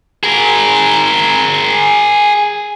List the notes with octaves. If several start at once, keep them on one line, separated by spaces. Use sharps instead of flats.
G#4 A#4